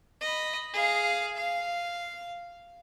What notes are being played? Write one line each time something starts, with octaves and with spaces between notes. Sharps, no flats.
D#5 B5
G#4 F5
F5